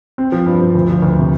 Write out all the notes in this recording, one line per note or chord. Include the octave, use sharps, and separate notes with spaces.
C4
F3
G2
F3
D2
F3
D2
C3